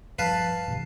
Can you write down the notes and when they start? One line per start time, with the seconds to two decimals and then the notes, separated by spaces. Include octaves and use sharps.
0.19 G2 F3 G3 B4 F5 A5
0.68 G#2 C3 E3